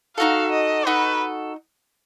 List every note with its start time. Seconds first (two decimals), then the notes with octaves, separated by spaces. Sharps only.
0.17 D#4 F#4 A4 F5
0.52 D#5
0.86 D#4 F#4 A4 B4